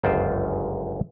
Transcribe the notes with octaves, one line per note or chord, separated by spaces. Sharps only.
G1 C#2 F#2 F4 C5 G5